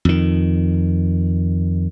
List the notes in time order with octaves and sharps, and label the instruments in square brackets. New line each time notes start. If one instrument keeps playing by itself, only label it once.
[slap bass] F2 D#3